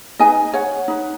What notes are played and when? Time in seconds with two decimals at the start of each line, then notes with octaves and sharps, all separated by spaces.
0.19 D#4 B4 D#5 G#5
0.53 C#5 F#5
0.88 D#4 B4